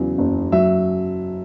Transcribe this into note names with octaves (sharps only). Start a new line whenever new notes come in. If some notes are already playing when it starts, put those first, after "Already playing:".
Already playing: E2 C#3 F#3
F#1
F#3 E5